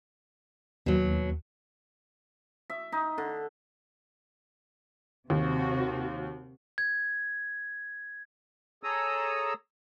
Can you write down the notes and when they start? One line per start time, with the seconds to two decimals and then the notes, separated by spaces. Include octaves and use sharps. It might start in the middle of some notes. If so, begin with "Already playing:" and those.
0.86 D#2 B2 F#3
2.70 E5
2.92 D#4
3.18 D3
5.30 D#2 C3 F#4
6.78 G#6
8.83 G#4 A4 C#5 A#5 D#6 E6